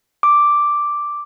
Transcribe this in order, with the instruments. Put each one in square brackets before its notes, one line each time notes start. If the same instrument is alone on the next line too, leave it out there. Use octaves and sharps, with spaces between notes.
[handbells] D6